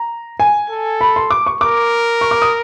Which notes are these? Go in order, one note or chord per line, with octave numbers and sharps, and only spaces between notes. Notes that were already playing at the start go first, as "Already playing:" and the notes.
Already playing: A#5
G#5
A4
B5
C6
D6
C#6
A#4 D6
C#6
D6
D#6